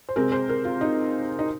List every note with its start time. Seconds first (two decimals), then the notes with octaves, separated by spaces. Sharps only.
0.09 C5
0.16 C3 G#3 C4 A#4
0.32 C5
0.49 A#4
0.65 F4
0.81 D#4
1.39 D#4